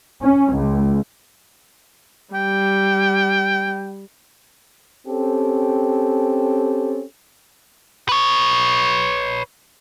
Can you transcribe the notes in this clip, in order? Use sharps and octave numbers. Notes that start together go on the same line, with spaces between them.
C#4
C#2
G3 G5
C4 C#4 G4 A4
B4 C#5